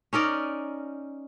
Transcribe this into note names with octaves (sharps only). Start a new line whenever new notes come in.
C#4 D#4 A#4 D5